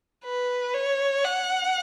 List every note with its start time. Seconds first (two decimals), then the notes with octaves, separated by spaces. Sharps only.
0.24 B4
0.74 C#5
1.24 F#5